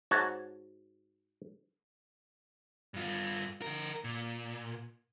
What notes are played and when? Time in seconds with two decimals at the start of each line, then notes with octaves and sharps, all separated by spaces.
0.11 G#2 F#4 C#5 A5
2.94 G2 F4
3.62 D3 A#4
4.04 A#2